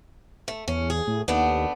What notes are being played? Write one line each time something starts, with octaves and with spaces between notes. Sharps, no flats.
A3
E2 C#4
G#4
A2
D#2 A3 B3 D4